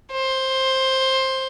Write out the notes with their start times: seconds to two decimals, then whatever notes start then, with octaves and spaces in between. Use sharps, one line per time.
0.12 C5